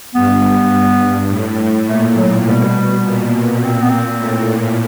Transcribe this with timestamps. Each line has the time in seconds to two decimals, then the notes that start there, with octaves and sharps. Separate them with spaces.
0.14 G2 B3
0.73 G2
1.30 A2
1.87 A#2 A3
2.16 F#3
2.46 B2 G3
3.03 A#2
3.61 A#2 C4
3.82 B3
3.90 C4
4.19 A2